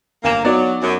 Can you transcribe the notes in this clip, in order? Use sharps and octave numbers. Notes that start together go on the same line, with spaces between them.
G1 A#3 G#5 E7
F#3 B3 D#4 F#4 D5
F#2